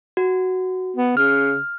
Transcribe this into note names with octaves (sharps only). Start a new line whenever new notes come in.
F#4
B3
C#3 F6